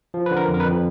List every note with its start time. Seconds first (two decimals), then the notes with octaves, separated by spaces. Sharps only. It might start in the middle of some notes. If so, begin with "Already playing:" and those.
0.14 F3
0.26 D3 B4
0.37 A#4
0.48 F2
0.54 A#4
0.60 B4
0.65 F2